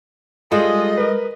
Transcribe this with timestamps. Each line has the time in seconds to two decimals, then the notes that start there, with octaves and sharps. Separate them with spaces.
0.52 G3 G#3 F4 G#4 A4 D#5
0.98 A#4 B4